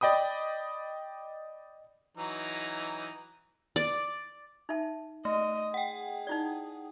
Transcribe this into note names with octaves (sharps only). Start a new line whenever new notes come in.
D5 D#5 G5 B5 D#6
E3 F#3 D#4
D5
D#4 E5 A5
A3 D#5
G#4 F#5 G5
D#4 E4 D5